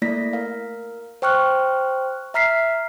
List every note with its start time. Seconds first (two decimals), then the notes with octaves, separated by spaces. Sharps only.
0.02 A3 A#3 E4 D5 A#6 B6
0.33 A#4 F5
1.22 C5 G5 C#6 F6 F#6
2.34 E5 A#5 F6 B6 C7